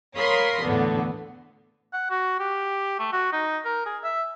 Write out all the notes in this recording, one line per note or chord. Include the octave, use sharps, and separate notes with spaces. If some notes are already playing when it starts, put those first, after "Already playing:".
A#4 C#5 F5 B5 C6 D#6
E2 A2 D3 B3
F#5
F#4
G4
A3
F#4
D#4
A#4
G#4
E5